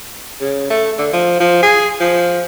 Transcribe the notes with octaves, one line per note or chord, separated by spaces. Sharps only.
C#3
A3
D3
F3
F3
G#4
F3